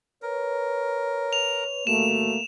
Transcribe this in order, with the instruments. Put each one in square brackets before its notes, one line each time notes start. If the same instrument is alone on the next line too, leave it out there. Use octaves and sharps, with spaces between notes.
[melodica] A#4 [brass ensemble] B4 C#5
[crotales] F7
[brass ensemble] G1 C#2 F#4 [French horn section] A3 A#3 [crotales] E7